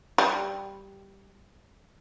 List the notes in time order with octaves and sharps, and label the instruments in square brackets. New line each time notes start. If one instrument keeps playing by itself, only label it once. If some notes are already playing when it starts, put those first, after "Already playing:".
[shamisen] G3